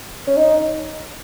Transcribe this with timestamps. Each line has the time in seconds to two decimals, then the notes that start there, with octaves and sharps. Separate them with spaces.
0.27 C#4
0.37 D#4